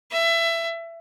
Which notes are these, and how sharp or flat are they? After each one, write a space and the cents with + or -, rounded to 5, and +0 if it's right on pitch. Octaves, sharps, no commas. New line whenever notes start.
E5 +20